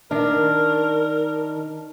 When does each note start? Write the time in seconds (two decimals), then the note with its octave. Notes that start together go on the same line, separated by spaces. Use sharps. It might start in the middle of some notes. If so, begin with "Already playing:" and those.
0.11 D#3 D4 A#4